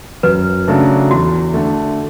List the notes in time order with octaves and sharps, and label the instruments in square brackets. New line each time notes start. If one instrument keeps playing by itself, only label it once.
[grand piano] F#2 [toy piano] B4
[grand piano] C#3 F#3 A3 D4
[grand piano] E2 [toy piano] F#4
[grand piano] D3 A3